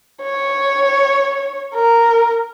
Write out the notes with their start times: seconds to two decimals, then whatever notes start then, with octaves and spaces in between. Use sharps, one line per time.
0.23 C#5
1.75 A#4